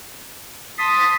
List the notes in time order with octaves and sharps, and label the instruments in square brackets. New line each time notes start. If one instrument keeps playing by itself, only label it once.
[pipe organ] A5 C6 [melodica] D#6 [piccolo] B6